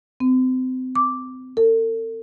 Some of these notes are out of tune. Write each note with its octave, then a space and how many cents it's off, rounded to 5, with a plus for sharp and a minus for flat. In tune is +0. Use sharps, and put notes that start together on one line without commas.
C4 -30
D6 -5
A4 +45